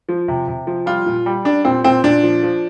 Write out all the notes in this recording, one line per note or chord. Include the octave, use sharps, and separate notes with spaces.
F3
C3
C3
F3
G3 F4
A#2
G3
G3 D4
A#2 C4
A#2 C4
A#2 D4
F3
F3